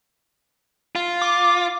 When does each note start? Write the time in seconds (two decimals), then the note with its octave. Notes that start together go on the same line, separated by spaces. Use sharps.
0.96 F4
1.22 D6